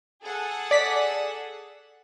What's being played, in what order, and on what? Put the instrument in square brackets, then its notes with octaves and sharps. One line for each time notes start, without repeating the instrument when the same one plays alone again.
[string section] G#4 A4 F#5
[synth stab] D5 B6